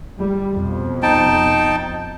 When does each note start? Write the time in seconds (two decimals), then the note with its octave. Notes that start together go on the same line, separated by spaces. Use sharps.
0.18 G3
0.54 F2 B2
1.03 D#4 G5 A5